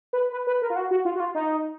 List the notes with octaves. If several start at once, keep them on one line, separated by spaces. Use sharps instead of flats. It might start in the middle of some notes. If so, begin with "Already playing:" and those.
B4
B4
B4
A#4
F4
F#4
F#4
F4
F#4
F4
D#4